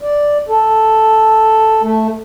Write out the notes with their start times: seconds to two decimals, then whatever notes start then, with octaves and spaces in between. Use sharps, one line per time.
0.01 D5
0.49 A4
1.82 A3